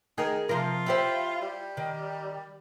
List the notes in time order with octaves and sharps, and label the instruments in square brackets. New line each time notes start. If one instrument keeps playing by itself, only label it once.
[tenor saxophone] D#3 [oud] G#4 A#4
[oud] C3 F3 A#4 [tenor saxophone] F4
[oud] E4 G4 C5
[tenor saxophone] G3
[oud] D#3